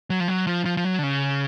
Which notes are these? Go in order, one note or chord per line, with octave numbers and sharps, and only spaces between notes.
F#3
F3
F#3
F3
F3
F3
F#3
D3
C#3